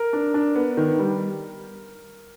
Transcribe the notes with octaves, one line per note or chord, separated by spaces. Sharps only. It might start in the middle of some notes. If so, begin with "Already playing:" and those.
Already playing: A#4
D4
D4
B3
D#3
G3